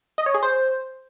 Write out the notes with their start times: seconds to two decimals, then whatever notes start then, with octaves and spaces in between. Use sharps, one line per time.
0.18 D#5
0.26 C#5
0.34 G#4
0.43 C5